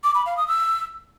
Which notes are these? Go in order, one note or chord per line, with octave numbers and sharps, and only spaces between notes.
D6
B5
F5
D#6
E6